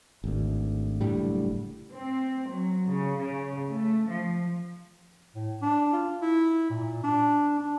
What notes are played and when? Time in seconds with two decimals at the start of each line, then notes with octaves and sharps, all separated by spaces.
0.24 G#1 D2
1.01 F#1 A2 D3 G3
1.92 C4
2.50 F#3
2.88 C#3
3.19 C#3
3.71 A3
4.09 F3
5.35 A2
5.62 D4
5.93 F4
6.21 E4
6.70 A#2
7.03 D4
7.59 D4